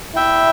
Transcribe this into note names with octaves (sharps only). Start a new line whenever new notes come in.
E4 E5 G5